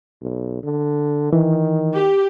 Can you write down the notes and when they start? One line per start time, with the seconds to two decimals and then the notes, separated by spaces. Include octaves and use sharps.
0.22 B1
0.63 D3
1.33 D#3 E3
1.94 G4